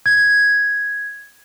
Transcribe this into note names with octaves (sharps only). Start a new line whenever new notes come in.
G#6